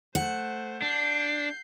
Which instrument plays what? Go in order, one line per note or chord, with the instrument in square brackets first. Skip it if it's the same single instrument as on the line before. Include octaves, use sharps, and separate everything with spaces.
[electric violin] A3 C5 [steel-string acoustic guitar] F#5
[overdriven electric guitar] D4 [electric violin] G6 C7